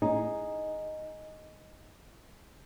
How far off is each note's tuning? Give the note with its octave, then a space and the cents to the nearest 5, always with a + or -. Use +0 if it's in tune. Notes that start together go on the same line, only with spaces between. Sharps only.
D#4 +0 G#4 +0